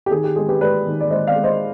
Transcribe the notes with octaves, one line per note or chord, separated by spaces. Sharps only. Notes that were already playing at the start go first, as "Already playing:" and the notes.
G4
D#3 G#4
G4
G#3 G#4
G4 B4
G#3 B4 D5
D#3
D5
G#3 C5 D#5
D5 F5
G#3
C5 D#5